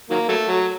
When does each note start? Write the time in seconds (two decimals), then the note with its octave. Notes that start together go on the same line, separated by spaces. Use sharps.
0.10 D#3 F#3 A#3
0.28 F#3 A3
0.47 F#3